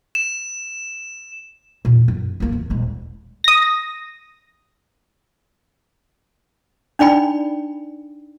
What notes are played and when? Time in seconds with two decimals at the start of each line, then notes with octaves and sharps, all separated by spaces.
0.15 E7
1.85 E2 A#2
2.08 F#2
2.40 E2 A#3
2.52 E2
2.70 D#1 G#3
3.44 D#6 A#6
6.99 D4 D#4 D5 G5 B5